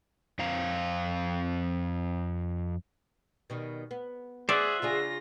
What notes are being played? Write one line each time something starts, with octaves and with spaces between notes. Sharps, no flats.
F2 C4 F5 A#5
B2 D#3 G3
B3
G#4 C5 D5 E5 F#5
C#3 D4 F4 G#4 A#6